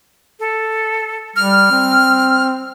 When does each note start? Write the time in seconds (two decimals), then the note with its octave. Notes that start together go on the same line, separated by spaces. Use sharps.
0.40 A4
1.36 G3 F6
1.71 C4